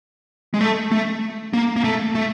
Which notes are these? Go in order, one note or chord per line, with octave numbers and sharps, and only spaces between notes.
G#3
A3
A3
A#3
A#3
A3
A3